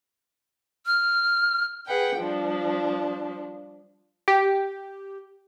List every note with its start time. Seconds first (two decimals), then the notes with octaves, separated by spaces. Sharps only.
0.86 F6
1.86 G#4 B4 F#5 G5
2.18 F3 G3 D4
4.28 G4